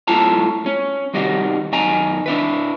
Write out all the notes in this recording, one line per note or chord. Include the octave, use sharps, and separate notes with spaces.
F#2 A3 E4 F4 A5 A#5
C#4
C2 D#3 G3 D#4 F#4
F#2 D#3 D#5 G#5 A#5
D4 E4 B4